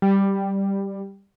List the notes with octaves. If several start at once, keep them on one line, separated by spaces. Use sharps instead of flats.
G3